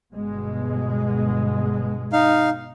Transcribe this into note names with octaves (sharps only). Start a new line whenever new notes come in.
G1 B2 G#3
D#4 F5